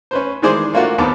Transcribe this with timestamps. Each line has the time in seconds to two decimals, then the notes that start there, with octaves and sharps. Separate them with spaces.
0.11 C#4 B4 C5
0.42 D#3 E3 G#3 G#4 C5 D5
0.74 A3 A#3 D4 F4 F#4
0.98 D#2 D#3 B3 C4 A5 D6